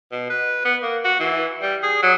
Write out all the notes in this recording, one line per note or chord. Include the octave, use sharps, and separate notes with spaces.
B2
B4
B3
A#3
F#4
E3
G3
G#4
F#3